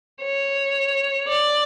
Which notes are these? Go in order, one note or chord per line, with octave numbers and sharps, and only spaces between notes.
C#5
D5